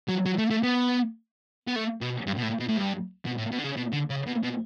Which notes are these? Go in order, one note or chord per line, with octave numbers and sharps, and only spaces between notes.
F#3
F#3
A3
A3
B3
B3
A3
B2
G2
B2
A2
B2
A2
G2
B2
A2
B2
D3
C#3
B2
D3
C#3
B2
B2